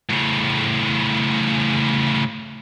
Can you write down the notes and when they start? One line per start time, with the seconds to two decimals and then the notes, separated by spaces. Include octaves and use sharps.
0.10 A2 C#3